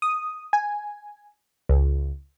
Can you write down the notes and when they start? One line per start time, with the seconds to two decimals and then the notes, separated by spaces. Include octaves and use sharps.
0.02 D#6
0.53 G#5
1.69 C#2